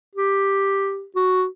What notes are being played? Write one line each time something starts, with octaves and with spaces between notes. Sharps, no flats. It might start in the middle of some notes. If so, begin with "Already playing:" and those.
G4
F#4